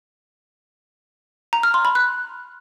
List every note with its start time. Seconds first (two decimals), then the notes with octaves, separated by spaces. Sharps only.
1.53 A#5
1.63 F6
1.74 C6
1.85 B5
1.95 F#6